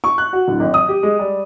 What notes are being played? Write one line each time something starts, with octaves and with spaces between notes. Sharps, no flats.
C#6
F#6
F#4
D1
G#1
D#6
G4
G#3
G3